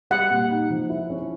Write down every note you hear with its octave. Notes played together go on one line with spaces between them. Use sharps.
G3 F#5
A#2
D#4
F3
E4
C#4